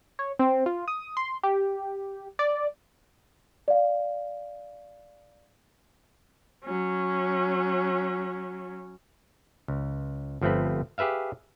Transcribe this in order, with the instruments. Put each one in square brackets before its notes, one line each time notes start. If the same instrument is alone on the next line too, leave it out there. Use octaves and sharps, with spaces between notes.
[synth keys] C#5
C4
F4
D#6
C6
G4
D5
[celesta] D5 F5
[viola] F#3 C#4
[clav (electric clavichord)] C#2
G1 F3 A3 C4 B4
G4 G#4 B4 E5 F5